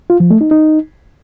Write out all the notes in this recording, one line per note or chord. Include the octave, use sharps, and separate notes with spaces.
F4
F3
A3
D#4
D#4